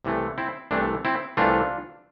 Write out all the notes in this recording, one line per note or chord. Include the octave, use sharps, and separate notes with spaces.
C2 C3 E3 A3
C4 E4
C2 C3 E3 A3 D4
C4 E4
C2 C3 E3 A3 D4 F4